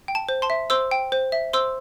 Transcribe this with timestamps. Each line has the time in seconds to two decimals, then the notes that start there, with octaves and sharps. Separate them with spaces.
0.08 G5
0.15 A5
0.29 C5
0.42 A5 C6
0.50 E5
0.70 C5 C6 E6
0.91 G5
1.12 C5
1.32 E5
1.53 C5 C6 E6